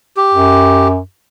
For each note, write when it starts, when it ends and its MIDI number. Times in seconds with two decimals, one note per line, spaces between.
0.17 0.88 67
0.34 0.98 42